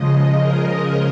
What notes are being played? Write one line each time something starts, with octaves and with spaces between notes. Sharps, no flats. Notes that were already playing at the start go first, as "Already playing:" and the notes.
Already playing: C#3 F3 G#3 D#5
A#4